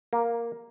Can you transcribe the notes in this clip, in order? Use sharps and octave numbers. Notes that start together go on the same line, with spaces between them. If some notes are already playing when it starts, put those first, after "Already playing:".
A#3